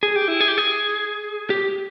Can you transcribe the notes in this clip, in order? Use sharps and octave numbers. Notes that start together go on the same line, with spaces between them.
G#4
G4
E4
G#4
G4
G#4
G4